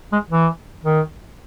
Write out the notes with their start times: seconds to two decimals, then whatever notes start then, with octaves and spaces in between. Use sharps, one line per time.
0.12 G#3
0.31 E3
0.84 D#3